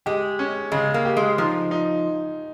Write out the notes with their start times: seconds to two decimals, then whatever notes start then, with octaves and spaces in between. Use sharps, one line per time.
0.06 G#3 G4
0.39 C#4
0.72 C#3 G#3
0.94 A#3
1.05 G4
1.17 G#3
1.38 F3 D#4
1.71 D#4